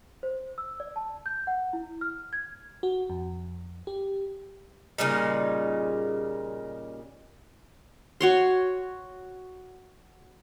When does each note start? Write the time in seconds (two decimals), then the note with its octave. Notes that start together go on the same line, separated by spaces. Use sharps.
0.23 C5
0.58 E6
0.80 D5
0.96 A5
1.26 G6
1.47 F#5
1.73 E4
2.01 F6
2.33 G#6
2.83 F#4
3.10 F2
3.87 G4
4.98 A#2 C#3 G3 D#4
8.21 F#4 C#5 C6